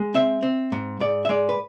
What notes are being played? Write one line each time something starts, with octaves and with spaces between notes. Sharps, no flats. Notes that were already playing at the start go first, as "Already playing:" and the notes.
Already playing: G#3
C4 E5
C4
G#2
G#2 D5
E5
G#3 D5
B4